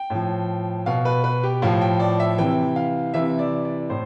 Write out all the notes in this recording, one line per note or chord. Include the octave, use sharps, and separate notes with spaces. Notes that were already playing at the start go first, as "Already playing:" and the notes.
Already playing: G5
A2 F3
B2 F5
B4
B4
G4
A2 F3 F5
G5
D5
E5
C3 E3 G5
F5
C3 E3 E5
D5
D5
A2 C5